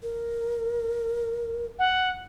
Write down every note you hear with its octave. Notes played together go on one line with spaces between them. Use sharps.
A#4
F#5